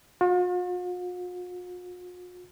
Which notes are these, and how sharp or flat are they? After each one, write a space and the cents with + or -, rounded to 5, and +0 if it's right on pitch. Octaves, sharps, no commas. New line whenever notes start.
F4 +45